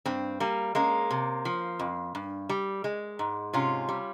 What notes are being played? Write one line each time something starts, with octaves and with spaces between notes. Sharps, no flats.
G2 C4
G3 A#3
G#3 A#3 C#4
C3
F3
F2
G2
G3
G#3
G#2
C3 C#4 F4
G3